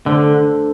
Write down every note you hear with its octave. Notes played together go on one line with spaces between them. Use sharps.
D3 A3 D4 A4 C5